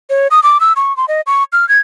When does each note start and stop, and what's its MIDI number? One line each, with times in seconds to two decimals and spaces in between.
0.10 0.28 73
0.31 0.42 87
0.43 0.60 86
0.60 0.73 88
0.76 0.95 85
0.97 1.06 84
1.08 1.21 75
1.27 1.44 85
1.53 1.67 89
1.69 1.79 92